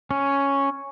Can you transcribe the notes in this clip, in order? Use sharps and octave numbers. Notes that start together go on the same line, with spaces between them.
C#4